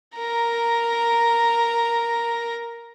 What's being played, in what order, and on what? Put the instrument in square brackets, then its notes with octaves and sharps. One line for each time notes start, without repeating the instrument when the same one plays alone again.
[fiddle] A#4 A#5